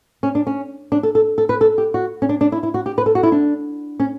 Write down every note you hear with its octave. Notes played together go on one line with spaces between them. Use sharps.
C#4
D4
C#4
D4
A4
A4
A4
B4
A4
G4
F#4
C#4
D4
D4
E4
E4
F#4
G4
B4
A4
F#4
E4
D4
C#4